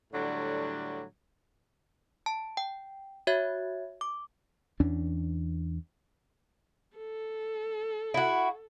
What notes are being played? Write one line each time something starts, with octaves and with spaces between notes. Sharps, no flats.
A2 D3 F#3 G3 D4
A5
G5
F#4 C#5 E5 G#6
D6
E2 E3 C#4 D4
A4
E4 F#4